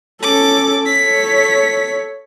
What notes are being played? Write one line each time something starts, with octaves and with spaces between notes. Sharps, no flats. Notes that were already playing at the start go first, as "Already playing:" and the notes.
C#4 A4 D6
A4 C#5 B6